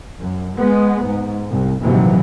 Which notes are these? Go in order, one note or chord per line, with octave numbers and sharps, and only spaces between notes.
F#2
G#3 B3
G#2
C2
A#1 D#2 G#2 C3 E3 F#3